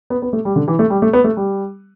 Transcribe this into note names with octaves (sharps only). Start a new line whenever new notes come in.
B3
B3
A3
G3
D3
E3
A3
G3
A3
B3
A3
G3